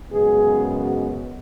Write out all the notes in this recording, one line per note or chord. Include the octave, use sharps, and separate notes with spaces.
F#2 C#3 G#3 B3 G#4
F#4